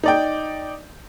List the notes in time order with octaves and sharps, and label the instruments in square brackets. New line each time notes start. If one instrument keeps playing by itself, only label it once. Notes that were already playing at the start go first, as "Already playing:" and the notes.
[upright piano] D#4 D5 G5